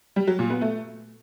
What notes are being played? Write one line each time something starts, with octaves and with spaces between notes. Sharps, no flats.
G3
F#3
A#2
B3
A3